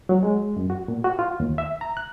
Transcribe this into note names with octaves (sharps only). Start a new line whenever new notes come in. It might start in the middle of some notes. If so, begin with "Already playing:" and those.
F#3
G#3
F#2
F#4
A#2
F#4
F4
D#2
E5
A#5
F#6